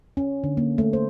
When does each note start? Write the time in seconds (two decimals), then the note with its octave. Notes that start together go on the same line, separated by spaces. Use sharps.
0.17 C#4
0.44 D3
0.57 A#3
0.78 A3
0.93 C5